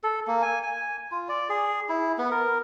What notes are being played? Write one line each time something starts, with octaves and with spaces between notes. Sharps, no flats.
A4
A#3
G#5
G#5
F4
D5
G#4
E4
B3
A#4